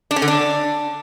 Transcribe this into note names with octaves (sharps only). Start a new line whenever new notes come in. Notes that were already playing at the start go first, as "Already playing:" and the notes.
D4
C#4
D3
D4